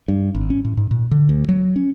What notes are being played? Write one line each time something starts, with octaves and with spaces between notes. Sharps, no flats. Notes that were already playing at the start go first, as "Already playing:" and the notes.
G2
G#1
C#4
A2
G#2
A#2
D3
D2
F#3
C#4